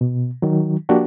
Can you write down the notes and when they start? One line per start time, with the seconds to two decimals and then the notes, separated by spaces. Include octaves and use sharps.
0.01 B2
0.42 D#3 F#3
0.89 F3 A#3 D4 F#4 G4